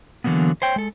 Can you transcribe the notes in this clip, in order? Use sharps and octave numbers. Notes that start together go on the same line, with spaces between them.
D3 E3 F#3 A#3 B3
C5 C#5 G5
G#3 A4